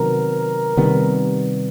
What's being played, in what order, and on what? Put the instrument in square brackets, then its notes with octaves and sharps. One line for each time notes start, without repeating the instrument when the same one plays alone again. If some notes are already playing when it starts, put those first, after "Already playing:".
Already playing: [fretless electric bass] C3 D#3 F#3 B3 [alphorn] A#4
[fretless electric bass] C3 D#3 G3 B3